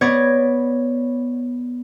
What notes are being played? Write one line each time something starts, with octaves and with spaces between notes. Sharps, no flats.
B3 C#5 D5 G#6 A#6